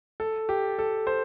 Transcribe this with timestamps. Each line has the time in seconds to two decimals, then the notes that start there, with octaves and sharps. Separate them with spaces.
0.20 A4
0.49 G4
0.79 A4
1.07 C5